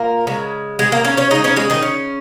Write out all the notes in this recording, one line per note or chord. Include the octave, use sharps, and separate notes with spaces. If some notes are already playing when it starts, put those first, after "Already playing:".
Already playing: A#2 A#3 A#4
C#3 G#3
G#3 G#4
A#3 A#4
C#4 C#5
C#4 C#5
C#3 G#3 D#4 D#5
C#4 C#5
G#3 G#4
D#3 D#4
C#4